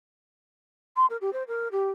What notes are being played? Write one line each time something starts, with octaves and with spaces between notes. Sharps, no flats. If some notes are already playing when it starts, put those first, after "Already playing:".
C6
A#4
G4
C5
A#4
G4